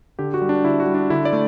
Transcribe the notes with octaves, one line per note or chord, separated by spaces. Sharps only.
D3 G4
F#4
G3
D4
D3 E4
F#4
G3
D4
D3 E4
D5
A3